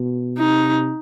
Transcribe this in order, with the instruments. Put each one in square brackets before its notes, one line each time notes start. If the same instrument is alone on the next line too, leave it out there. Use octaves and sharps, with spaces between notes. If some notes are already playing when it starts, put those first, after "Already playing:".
Already playing: [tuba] B2
[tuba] C3 [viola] D#4